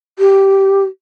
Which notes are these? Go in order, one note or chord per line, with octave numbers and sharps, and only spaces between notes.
G4